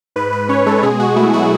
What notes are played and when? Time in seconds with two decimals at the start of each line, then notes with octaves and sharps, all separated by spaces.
0.16 G#2 B4
0.33 G#2 B4
0.49 C#4 C#5
0.66 G#3 A4
0.83 B2 G#4
1.00 B2 F#4
1.16 A3 E4
1.33 F#3 F#4